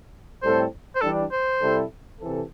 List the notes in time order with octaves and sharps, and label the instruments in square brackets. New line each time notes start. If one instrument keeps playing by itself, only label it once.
[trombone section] A2 G3 C4 A4 [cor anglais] C5
[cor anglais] C5
[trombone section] E3 G3 D4 [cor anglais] A4
[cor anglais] C5
[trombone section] C3 G3 E4 A4
C3 E3 C4 A4